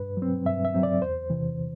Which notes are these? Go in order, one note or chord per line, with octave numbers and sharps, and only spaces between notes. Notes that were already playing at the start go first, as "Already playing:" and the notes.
Already playing: G2 B4
F#3 C4
G2 E5
E5
F#3 C4
D5
E2 C5
C3 E3